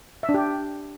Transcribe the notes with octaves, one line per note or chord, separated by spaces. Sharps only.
E5
D4
G4